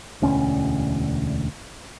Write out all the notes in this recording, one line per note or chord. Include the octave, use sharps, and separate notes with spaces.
E1 D2 C#4